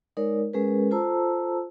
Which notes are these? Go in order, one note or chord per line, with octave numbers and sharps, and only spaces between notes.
G#3 D#4 A#4 C#5 D5
G#3 C#4 G#4 A#4 B4
F4 A4 C5 A5 A#5 E6